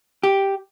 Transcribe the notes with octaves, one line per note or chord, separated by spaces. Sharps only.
G4